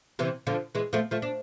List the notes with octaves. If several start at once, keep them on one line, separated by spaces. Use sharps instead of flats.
C3 E3
D3 F3
E3 G#3
F3 A3
F3 A3
D4